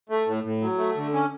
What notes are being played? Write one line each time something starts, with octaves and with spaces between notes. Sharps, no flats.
A3
A2
A2
F#3
A3
D3
C#4